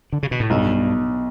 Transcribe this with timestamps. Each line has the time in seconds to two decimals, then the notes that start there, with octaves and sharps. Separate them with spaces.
0.13 D3
0.23 C#3
0.31 B2
0.40 A2
0.50 B1 G2